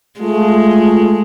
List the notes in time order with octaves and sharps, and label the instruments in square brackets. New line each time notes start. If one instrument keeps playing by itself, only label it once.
[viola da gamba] G#3 [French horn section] A3 F4